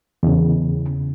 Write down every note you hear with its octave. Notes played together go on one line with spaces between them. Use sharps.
E2 C#3